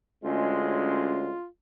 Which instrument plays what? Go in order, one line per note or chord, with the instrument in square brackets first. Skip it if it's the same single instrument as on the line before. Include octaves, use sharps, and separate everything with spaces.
[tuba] D2 [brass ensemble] G#3 C#4 [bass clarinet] F4